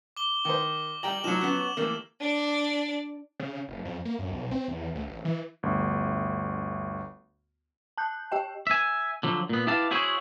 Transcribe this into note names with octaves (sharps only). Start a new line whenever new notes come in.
D6 G7
D#3 C5 D6
G3 G5 G#5 A#5 F#7
F3 F#3 D#4 C#5 E7
B3 C#4 F#4
E3 G3 A3 A#3
D4 D5
C#3
F#1
F2
A#3
F#2
B1
C4
E2
D2
A1
E3
G1 D2
A5 F#6 G6
G4 D#5 G5
E5 G#5
D3 F3 F#3
A#2 B3
E4 G4 B4 F5 A5
E4 F#4 G#4 C5 C#5